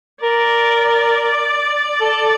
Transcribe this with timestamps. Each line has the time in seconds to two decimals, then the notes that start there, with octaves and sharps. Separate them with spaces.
0.22 A#4 D5
2.00 A4